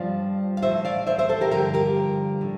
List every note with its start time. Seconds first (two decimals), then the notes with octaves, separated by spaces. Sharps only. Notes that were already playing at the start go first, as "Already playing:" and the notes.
Already playing: G2 F3 D5 F5
0.57 F5
0.62 A2 E3 C5 E5
0.85 D5 F5
1.07 C5 E5
1.18 C5 E5
1.29 A4 C5
1.41 G4 A#4
1.51 G2 D3 F3 G4 A#4
1.74 G4 A#4
2.41 A2